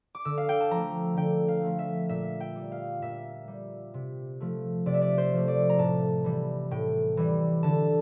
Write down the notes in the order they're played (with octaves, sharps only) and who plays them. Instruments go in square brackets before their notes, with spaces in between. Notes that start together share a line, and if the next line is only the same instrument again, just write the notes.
[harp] D6
D3 E6
F5
G5
A5
F3 A3 A#5
D3 G5
F5
F3 A3
E5
A#2 E5
G5
G3
F5
A#2 E5
G3
C3
F3 A3
C3 D5
E5
D5
C5
F3 A3
D5
A#5
A2 A5
E3 G3
A2 G5
E3 G3
D3 A5